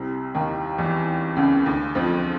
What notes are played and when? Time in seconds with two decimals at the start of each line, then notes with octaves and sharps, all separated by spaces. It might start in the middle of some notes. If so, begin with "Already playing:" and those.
Already playing: C2 C3
0.34 D#2 D#3
0.78 E2 E3
1.36 C#2 C#3
1.66 D2 D3
1.95 F2 F3